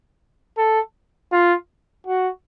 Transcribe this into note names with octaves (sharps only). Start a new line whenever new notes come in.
A4
F4
F#4